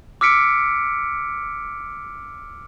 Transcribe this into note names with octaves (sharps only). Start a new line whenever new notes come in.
D6 E6 F6 B6 C#7 D7